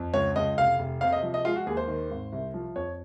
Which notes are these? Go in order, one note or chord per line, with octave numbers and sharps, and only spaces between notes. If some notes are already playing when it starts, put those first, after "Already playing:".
Already playing: F2
C#2 C#5
C#2 D#5
F1 F5
F1
C3 F5
D#5
F3
D#5
G#3 F4
F#4
D#2 G#4
C5
D#3
G#1
C2
F3
F2 C#5